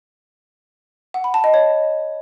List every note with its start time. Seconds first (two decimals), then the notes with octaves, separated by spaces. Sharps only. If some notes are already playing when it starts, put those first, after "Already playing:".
1.14 F#5
1.24 B5
1.34 A5
1.44 D#5
1.54 C#5